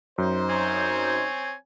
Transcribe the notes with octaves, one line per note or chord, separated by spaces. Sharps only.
F#2 D#4 C5
C4 C#5 G#5